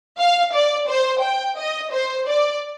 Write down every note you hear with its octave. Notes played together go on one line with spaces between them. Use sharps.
F5
D5
C5
G5
D#5
C5
D5